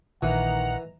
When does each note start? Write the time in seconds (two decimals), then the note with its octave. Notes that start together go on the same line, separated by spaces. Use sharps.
0.22 A#1 D#3 E3 F#5 A#5